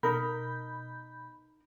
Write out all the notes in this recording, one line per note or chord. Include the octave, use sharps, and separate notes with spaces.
B2 D#4 A#4 B5 G6